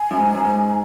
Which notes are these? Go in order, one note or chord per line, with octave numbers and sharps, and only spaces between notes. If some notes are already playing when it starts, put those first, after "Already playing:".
Already playing: G#5
F#2
G#2
F#2
G#2